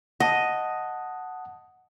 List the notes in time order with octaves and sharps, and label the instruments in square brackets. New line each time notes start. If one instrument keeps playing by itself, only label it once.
[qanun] D#5 [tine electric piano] F#5 A5 D#6